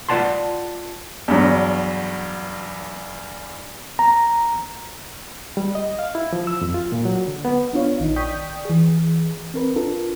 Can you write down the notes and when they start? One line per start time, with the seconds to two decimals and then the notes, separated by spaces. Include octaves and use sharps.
0.09 F4 D5 F#5 A5 C6
1.28 E2 G2 F#3
3.99 A#5
5.57 G3
5.75 D#5
5.99 F5
6.15 E4
6.33 F3
6.47 E6
6.61 F2
6.74 F4
6.92 A#2
7.05 F#3
7.27 D3
7.45 B3
7.73 B3 D4 E4 F4 C#5 F5
8.00 A#1 D#3 D#4
8.16 D5 G5 C#6 D#6 G6 B6
8.65 E3 G#4
9.54 C4 A#4 B4
9.76 D4 F4 A4 A#4